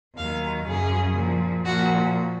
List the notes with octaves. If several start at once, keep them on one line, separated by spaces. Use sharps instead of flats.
D#2 D#3 F#3 F5
F#2 C#3 F#3 G#4
A#2 F3
A#2 F3 F#4